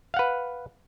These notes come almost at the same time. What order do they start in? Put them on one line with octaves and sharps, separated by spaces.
F5 F#5 B4